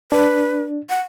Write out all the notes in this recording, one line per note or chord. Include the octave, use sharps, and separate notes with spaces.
D4 B4
F#5